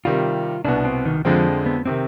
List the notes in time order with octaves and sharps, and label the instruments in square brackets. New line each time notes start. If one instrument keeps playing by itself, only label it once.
[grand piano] C3 D#3 G3 [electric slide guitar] F4
[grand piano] C2 B2 B3 [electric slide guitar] D4
[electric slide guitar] C4
D#3
[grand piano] F2 D3 G#3 C4 [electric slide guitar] F3
[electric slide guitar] B3
[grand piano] C3 D#3 [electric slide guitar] C4